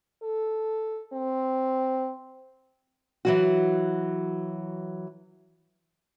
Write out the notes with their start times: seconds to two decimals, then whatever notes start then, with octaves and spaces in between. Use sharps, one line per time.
0.23 A4
1.13 C4
3.25 E3 F#3 F#4